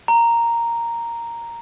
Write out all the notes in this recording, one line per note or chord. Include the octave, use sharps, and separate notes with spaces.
A#5